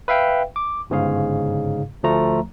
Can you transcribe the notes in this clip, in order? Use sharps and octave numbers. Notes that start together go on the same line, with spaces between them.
B4 E5 F5 G5
D6
G1 G#2 C#3 G#4 F5
D2 F3 A3 A#5